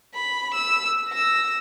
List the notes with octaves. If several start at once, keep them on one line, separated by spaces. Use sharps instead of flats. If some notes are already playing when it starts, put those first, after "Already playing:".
B5
E6
E6 A#6